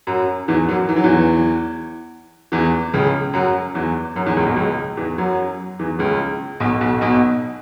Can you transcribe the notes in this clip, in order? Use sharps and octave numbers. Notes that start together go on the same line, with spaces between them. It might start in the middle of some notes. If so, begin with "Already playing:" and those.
F#2 F#3
E2 E3
F#2 F#3
E3
F#3
E2 E3
E2 E3
C#2 C#3
F#2 F#3
E2 E3
F#2 F#3
E2 E3
C#2 C#3
B1 B2
C#2 C#3
E2 E3
F#2 F#3
E2 E3
C#2 C#3
B1 B2
B1 B2
B1 B2